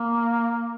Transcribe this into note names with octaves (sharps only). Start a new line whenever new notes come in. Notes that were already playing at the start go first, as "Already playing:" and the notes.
Already playing: A#3